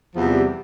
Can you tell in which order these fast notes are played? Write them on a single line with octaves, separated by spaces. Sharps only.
F3 E2 C3 G3